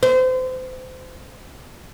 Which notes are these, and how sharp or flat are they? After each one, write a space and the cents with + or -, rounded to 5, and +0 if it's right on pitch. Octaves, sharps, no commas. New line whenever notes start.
C5 -30